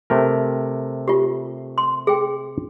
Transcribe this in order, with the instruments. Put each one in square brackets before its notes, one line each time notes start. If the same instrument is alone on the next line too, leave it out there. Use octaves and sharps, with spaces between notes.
[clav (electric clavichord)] C3 A3 A#4
[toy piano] F4 G4
C6
G#4 G5